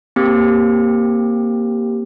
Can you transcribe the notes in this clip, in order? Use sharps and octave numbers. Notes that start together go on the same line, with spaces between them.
A#3 C4 G4